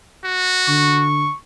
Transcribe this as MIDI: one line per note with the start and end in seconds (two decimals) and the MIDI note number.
0.24 1.06 66
0.68 1.28 50
0.68 1.37 85